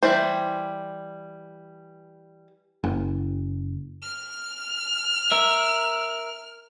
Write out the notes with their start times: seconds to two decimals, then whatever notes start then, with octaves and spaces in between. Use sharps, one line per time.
0.03 E3 G3 C5
2.84 F#1
4.02 F6
5.32 A#4 E5